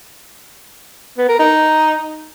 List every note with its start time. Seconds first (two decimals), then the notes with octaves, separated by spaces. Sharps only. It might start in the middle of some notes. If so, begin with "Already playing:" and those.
1.18 B3
1.28 A#4
1.39 D#4